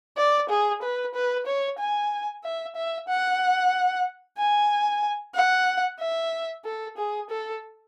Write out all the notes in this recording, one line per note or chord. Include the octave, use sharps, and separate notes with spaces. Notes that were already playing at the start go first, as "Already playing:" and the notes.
D5
G#4
B4
B4
C#5
G#5
E5
E5
F#5
G#5
F#5
E5
A4
G#4
A4